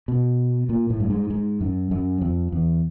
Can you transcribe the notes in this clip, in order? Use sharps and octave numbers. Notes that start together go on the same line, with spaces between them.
B2
A#2
A2
G2
G#2
G#2
F#2
F#2
F2
E2